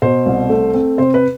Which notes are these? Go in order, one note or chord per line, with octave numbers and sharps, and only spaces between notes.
B2 C5
C2
A3
C4
C3 C5
B4